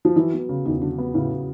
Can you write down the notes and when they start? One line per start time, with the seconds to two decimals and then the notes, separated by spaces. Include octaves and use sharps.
0.05 F3
0.16 E3 F#3
0.33 B3
0.49 C#3
0.65 E2 D#3
0.81 D3 F#3
0.98 B3
1.14 A2 C#3